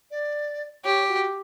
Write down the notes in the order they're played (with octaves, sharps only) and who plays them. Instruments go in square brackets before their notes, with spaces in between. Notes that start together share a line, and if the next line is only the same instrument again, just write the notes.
[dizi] D5
[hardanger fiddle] G4 [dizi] C#5
[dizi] F#4